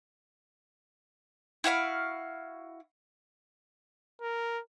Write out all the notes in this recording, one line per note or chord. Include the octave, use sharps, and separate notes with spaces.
E4 F#4 F5 B5
A#4